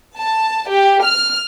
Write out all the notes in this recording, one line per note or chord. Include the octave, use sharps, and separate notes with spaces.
A5
G4
F6